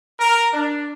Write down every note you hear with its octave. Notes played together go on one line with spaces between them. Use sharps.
A#4
D4